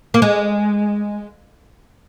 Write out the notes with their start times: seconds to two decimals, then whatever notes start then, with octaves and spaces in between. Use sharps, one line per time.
0.14 A#3
0.22 G#3